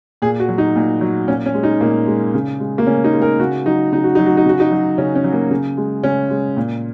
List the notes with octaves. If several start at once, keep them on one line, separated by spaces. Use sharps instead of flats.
A#2 G#4
F#4
F#3
D#4
A#2
F#3
A#2 C#4
C#4
G#3
D#4
A#2 A#3
G#3
C#3
G#3
A#3
C#3 C#4
D#4
G#3
A#4
C#3 F#4
F#3 D#4
C#3 D#4
F#4
F#3 D#4
F#4
D#4
C#3 F#4
D#4
F#3
C#3 C#4
C#4
F#3
A#3
C#3
G#3
C#3 C#4
G#3
A#2